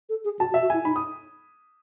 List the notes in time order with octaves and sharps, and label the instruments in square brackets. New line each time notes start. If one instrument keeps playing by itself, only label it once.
[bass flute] A4
G#4
[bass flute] F#4 [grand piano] A5
[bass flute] F#4
[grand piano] E5
[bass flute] F#4
[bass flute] E4 [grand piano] G#5
[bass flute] D#4 [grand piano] B5
[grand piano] D#6